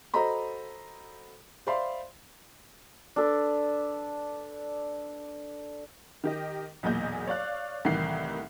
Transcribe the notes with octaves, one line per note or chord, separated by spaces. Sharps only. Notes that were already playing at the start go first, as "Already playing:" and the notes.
F#4 A4 C5 D#5 A#5 B5
C5 D5 E5 F5 B5 C6
D4 A4 B4
D#3 G4 D#5
B1 E2 A#2 G#4 D#5 G6
C#5 D5 F5 F#6
C2 A2 D#3 E3 C7